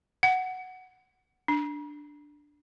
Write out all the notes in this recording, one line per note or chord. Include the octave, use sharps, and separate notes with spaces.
F#5
D4